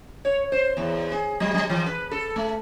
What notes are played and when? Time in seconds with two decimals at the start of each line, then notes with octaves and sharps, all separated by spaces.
0.25 C#5
0.52 C5
0.77 E2
1.12 G#4
1.40 F#3
1.54 F#3
1.70 E3
1.86 B4
2.11 A4
2.36 A3